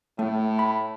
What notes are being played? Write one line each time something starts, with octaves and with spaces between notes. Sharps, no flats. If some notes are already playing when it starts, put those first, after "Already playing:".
A2 A3
B5